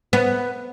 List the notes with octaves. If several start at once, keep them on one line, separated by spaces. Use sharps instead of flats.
B3